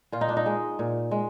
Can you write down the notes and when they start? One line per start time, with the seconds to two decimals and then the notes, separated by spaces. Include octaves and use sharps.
0.12 A#2 F4
0.21 D#4
0.29 D4
0.37 D#4
0.46 G#3
0.79 A#2
1.11 G#3